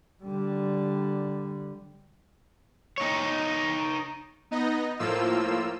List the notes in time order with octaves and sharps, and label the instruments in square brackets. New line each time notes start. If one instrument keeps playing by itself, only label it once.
[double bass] D3 G3
[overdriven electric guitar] D#4 C#5
[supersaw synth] B3 D#4 D#5
A2 F3 A#3 F4 E6